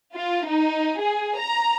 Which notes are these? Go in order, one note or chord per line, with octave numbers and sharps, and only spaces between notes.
F4
D#4
G#4
A#5